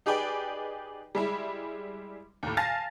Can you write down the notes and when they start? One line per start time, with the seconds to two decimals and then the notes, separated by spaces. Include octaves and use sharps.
0.06 D#4 G4 G#4 B4 D5 G5
1.15 G3 G#3 E4
2.43 D#2 A2
2.57 F5 G#5 A5 F6 A6 A#6